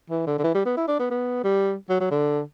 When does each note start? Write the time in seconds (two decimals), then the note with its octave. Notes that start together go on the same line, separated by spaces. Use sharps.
0.10 E3
0.27 D3
0.39 D3
0.44 E3
0.55 G3
0.66 B3
0.77 E4
0.88 D4
1.00 B3
1.11 B3
1.44 G3
1.90 F#3
2.01 F#3
2.11 D3